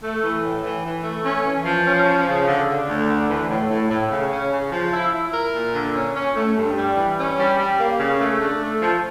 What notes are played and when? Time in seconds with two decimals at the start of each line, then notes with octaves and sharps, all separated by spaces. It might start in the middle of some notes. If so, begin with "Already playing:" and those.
0.01 A3
0.22 E3
0.42 A2
0.63 E3
0.83 E3
1.03 A3
1.24 C#4
1.45 E3
1.65 F3
1.85 C#4
2.06 F3
2.26 C#3
2.47 D3
2.67 D3
2.87 D2
3.08 D3
3.28 E3
3.49 A2
3.69 A2
3.90 A2
4.10 C#3
4.31 C#4
4.51 C#3
4.72 F3
4.92 E4
5.12 E4
5.33 A#4
5.53 A#2
5.74 D3
5.94 C#4
6.14 C#4
6.35 A3
6.56 G2
6.76 G3
6.96 E3
7.17 C#4
7.37 G3
7.58 G3
7.78 A#3
7.99 C#3
8.19 A3
8.40 D4
8.61 A3
8.81 F3